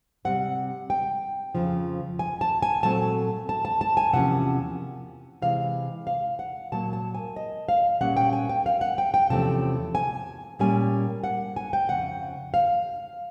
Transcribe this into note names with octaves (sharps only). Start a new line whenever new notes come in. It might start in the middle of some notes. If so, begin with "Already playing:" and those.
C3 E3 G3 C4 F#5
G5
F2 C#3 F3
G#5
A5
G#5
A#2 F#3 A3 C4 A5
A5
A5
A5
G#5
E2 C3 F3 A#3 C#4 F#5
C3 E3 G#3 F5
F5
F#5
A#2 F#3 A#3 A5
A5
G#5
D#5
F5
A#2 G3 A#3 C#4 F#5
G5
G#5
G5
F5
F#5
G5
G5
E2 C3 F3 A3 C#4 A5
G#5
A#2 G3 A#3 C#4 G#5
F#5
G#5
G5
F2 C#3 F#5
F5